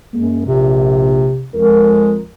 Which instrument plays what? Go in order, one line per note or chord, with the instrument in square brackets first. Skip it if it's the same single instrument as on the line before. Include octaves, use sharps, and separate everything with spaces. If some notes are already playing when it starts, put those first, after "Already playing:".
[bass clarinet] F#2 [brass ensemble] G#3 A#3
[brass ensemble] A#1 [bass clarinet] C3
[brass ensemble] F2 A#4 [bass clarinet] G#3